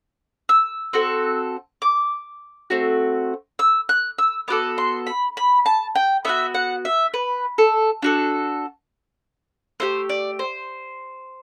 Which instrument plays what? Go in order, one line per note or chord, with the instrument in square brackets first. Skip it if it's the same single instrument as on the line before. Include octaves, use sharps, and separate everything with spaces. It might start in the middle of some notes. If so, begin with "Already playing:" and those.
[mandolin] E6
C4 F#4 A4
D6
A3 C4 F#4
E6
F#6
E6
B3 F#4 A4 D6
C6
B5
B5
A5
G5
B3 D4 F#4 E5
F#5
E5
B4
A4
D4 F#4 A4
A3 E4 G4 C5
D5
C5